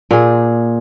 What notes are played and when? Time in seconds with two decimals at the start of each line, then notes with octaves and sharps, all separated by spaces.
0.11 A#2 G#4